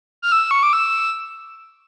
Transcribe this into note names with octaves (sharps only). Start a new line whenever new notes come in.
F6
E6
C#6
D6
E6